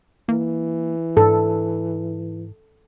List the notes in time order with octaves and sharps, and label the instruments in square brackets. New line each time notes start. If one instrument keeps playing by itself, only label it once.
[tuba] E3 [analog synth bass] A#3
[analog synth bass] G#2 [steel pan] A4